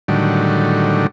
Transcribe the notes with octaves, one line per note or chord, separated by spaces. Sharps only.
A2 D3 D#3 F#3 G3